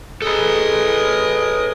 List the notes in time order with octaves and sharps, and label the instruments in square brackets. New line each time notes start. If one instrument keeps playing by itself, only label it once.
[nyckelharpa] G#4 D#5 [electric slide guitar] A4 B4